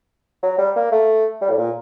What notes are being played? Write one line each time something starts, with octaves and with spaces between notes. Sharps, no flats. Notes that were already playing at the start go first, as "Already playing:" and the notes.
F#3
G3
A#3
A3
G3
A2
A#2